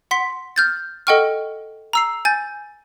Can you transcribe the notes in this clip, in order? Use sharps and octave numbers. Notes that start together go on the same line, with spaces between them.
F#5 C6 B6
F6 G6 A6
A4 D#5 F#5 G5 C#6 F6
A#5 E6 C7
G#5 G6 A6